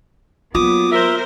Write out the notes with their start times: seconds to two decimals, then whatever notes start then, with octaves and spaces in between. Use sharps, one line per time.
0.55 F#3 A#3 B3 F4 D6 D#6
0.92 A#4 C5 E5